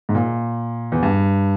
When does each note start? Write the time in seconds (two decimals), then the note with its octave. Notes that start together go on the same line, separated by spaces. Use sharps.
0.09 G#2
0.15 A#2
0.92 E2
1.03 G2